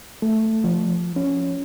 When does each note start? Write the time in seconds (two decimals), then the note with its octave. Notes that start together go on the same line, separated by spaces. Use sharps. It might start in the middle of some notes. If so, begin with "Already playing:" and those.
0.22 A3
0.64 F3
1.16 C#4